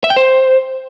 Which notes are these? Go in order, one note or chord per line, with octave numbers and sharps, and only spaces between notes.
E5
G5
C5